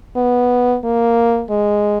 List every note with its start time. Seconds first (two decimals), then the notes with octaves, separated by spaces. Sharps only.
0.16 B3
0.84 A#3
1.50 G#3